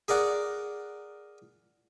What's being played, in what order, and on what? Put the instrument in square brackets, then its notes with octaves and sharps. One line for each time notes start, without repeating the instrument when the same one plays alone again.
[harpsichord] G#4 A#4 D5 F#5